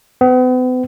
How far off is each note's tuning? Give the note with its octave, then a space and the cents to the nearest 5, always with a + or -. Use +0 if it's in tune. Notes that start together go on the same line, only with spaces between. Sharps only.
B3 +45